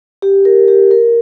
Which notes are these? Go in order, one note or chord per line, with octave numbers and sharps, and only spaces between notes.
G4
A#4
G4
A#4